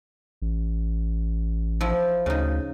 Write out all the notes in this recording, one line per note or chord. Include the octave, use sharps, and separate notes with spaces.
A1
F3 E4
D2 C#3 D#4